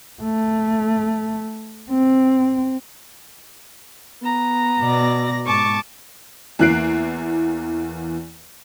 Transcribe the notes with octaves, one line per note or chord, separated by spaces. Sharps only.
A3
C4
B3 A#5
B2 D5 A#6
G#2 A5 C#6 D6
E2 E3 A#3 F#6 C7 D7